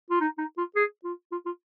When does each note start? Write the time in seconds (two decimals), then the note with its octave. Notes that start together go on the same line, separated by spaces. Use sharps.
0.10 F4
0.21 D#4
0.38 D#4
0.58 F4
0.76 G#4
1.04 F4
1.32 F4
1.46 F4